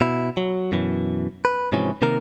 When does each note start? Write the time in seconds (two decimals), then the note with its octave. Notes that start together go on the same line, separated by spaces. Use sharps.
0.01 B2 E4
0.37 F#3
0.72 F#2 B2 E3
1.45 B4
1.72 G#2 C3 E3 F3 C#4
2.02 C3 D#3 A#3 A#4